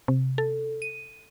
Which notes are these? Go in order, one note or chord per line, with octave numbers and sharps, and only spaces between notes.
C3
A4
D#7